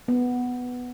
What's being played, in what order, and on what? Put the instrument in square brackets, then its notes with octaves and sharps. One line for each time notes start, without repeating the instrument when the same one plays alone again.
[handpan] B3